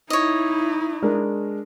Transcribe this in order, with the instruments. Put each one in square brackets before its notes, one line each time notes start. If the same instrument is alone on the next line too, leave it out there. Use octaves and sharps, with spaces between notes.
[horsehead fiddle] D#4 E4 [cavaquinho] C#5 D#5
[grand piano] G#3 D4 A#4